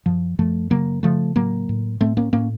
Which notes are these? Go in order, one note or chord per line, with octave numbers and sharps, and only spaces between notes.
F#2 F3
F#2 F3 A3
C#3 F#3 A#3
C#3 F3 A3
A2 F#3 A#3
A2
A2 A3 C4
A#3 C#4
A2 A#3 C#4